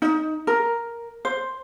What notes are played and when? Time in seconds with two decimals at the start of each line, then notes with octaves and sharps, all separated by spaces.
0.02 D#4
0.47 A#4
1.25 C5